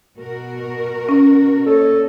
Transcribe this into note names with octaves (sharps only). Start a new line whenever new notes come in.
B2 F#4 A#4
C#4
A#2 A4 C#5 D#5